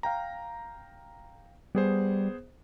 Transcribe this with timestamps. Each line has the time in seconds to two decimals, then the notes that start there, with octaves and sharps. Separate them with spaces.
0.03 F5 G5 A#5
1.75 G3 B3 G#4 C5